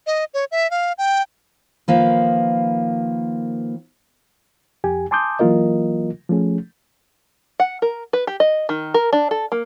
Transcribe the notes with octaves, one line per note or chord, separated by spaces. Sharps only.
D#5
C#5
E5
F5
G5
D#3 F3 A#3 B4
F2 G4 G#5
G#5 A5 C6 D6 D#6 G6
E3 F#3 A#3 F4 A#4 D#5
F3 A3 C#4 G#4
F#5
A#4
B4
G4
D#5
D#3
A#4
D4
A4
A#3